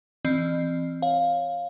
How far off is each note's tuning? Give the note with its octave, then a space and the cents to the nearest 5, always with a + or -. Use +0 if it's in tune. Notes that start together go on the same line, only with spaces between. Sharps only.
E3 +10 C4 +0 D#5 -45
C#5 -10 F5 +5